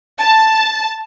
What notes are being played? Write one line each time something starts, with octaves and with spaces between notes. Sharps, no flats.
A5